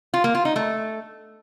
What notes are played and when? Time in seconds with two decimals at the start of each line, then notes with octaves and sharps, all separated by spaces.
0.14 F4
0.24 A#3
0.35 F4
0.45 D#4
0.56 A3